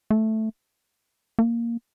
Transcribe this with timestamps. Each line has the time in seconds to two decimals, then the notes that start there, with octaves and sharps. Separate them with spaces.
0.11 A3
1.39 A#3